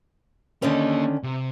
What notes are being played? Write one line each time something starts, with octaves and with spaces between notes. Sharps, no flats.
D3 D#3 A#3 C#4 D#5
C3